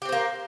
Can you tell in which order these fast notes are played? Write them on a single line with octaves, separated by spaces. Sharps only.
G4 C4 C5 A#3